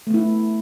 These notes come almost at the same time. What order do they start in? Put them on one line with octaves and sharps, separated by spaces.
A3 B3 E4